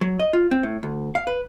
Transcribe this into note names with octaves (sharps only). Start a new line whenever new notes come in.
F#3
D#5
F4
C4
A2
D2
F5
B4